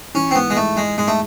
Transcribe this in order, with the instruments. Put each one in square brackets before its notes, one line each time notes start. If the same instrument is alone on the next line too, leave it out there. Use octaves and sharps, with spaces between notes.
[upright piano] E3 [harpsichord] C#4
[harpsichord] C4
[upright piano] G#2 [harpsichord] B3
[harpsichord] G#3
[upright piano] G#2 [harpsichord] A3
[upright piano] G#2 [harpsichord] G#3
[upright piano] G#2 [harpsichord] G#3
[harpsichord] A3